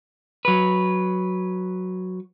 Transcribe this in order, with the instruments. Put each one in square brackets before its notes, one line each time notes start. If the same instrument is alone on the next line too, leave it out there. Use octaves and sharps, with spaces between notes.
[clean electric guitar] F#3 B4